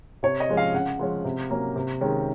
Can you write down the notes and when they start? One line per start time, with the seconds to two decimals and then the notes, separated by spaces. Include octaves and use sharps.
0.23 C3 C#5
0.40 D#5
0.49 F3 G#3 C#4
0.57 F5
0.74 C#3 F#5
0.99 F3 G#3 C#4
1.25 C3
1.50 F#3 A#3 C#4
1.76 C3
2.01 D#3 G#3 C#4